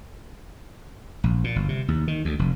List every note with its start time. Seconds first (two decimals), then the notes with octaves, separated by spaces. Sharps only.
1.24 A#1
1.44 A#2
1.56 G1
1.69 C3
1.88 D#2
2.08 D#3
2.25 D2
2.39 F1